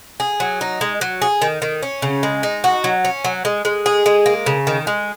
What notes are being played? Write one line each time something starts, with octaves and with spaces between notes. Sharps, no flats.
G#4
F#3
D#4
G#3
F#3
G#4
D#3
D#3
C#4
C#3
G#3
D#4
F#4
F#3
C#4
F#3
G#3
G#3
G#4
G#3
A#3
C#3
D#3
G#3